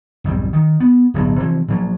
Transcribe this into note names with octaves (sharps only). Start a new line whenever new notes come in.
B1 F2 G#2 G3
D#3
B3
D1 B1 G2
C3 E3 F3
A#2 F3 F#3